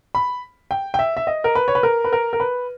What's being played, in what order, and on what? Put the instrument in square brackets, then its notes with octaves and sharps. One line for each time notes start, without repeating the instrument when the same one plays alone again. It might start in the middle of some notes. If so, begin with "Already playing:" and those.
[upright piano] B5
G5
G5
E5
E5
D#5
A#4
B4
C#5
B4
A#4
B4
A#4
A#4
B4